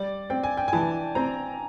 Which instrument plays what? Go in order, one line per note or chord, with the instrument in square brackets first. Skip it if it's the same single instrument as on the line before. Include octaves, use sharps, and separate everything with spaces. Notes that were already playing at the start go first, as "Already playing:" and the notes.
Already playing: [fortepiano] G3 [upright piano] D5
[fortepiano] C4 [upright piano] G5
[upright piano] G#5
G5
G#5
[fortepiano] E3 [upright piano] A5
[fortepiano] C4 [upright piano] A#5